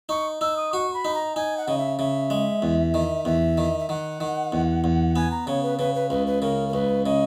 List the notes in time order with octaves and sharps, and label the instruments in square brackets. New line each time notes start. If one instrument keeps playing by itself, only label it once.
[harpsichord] D#4 [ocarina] C#6
[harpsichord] D#4 [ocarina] E6
[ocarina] D#6
[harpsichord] F#4 [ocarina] C#6
[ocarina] B5
[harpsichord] D#4
[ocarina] A#5
[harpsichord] D#4 [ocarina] G#5
[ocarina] F#5
[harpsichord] C#3 [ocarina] D#5
[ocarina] E5
[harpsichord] C#3 [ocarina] E5
[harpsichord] G#3
E2
D#3
[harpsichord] E2 [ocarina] E5
[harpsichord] D#3
[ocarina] E5
[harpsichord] D#3 [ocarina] F#5
[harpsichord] D#3
E2
E2
[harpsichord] B3 [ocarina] G#5
[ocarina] A#5
[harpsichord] C#3 [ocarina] C#5
[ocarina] B4
[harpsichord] C#3 [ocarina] B4
[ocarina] B4
[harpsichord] C#2 [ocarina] B4
[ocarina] B4
[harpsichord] C#3 [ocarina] A#4
[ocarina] A#4
[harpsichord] C#2 [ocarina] B4
[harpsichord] C#3 [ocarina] D#5